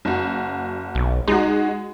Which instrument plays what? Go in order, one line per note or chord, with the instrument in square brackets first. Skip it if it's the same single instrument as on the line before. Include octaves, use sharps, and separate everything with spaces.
[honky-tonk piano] F#1 F#4
[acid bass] B1
[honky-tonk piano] G#3 F#4 [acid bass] D#4